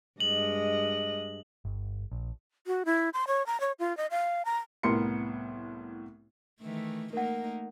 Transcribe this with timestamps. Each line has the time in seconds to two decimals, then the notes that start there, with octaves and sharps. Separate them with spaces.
0.20 G2 G#3 D#5 F#7
1.65 G1
2.12 A#1
2.67 F#4
2.85 E4
3.14 C6
3.28 C#5
3.47 A#5
3.60 C#5
3.79 F4
3.97 D#5
4.11 F5
4.45 A#5
4.83 C2 A2 B3 A#4 C6 C#7
6.61 D#3 E3 A3
7.13 A3 A#3 D#4 A#4 F#5